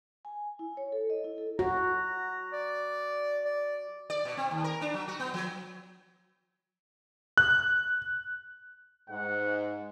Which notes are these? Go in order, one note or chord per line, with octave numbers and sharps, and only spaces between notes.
G#5
E4
C#5
A4
D#5
E4
A4
F#4 A#5
D5
D5
D5
B2
C4
D#2
A#4
D4
F#3
F#4
B3
F3
F#6
G#2 F#5